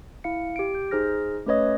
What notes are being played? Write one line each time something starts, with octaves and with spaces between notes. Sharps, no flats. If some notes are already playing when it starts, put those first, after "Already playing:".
E4 F5 C#7
G4 D7
G6
D#4 G#4 C5 F6 A#6
A3 C#4 B4 C#5 D#5 D#6